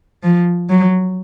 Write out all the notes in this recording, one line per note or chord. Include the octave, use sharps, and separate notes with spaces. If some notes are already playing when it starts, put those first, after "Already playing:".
F3
F#3